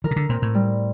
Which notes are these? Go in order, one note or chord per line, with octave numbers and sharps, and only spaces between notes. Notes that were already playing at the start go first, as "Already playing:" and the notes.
E3 A#4
C3
D3
A#2 C4
A2
G3